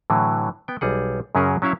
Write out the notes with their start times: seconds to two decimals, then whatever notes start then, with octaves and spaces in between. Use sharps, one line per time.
0.10 A2 D3 E3 F#3
0.68 B3 G5
0.81 B1 G3 G#4 F#5
1.35 F#2 C#3 F#3 C#4 G#4 A#4
1.62 F#3 C#4 E4 E5 F5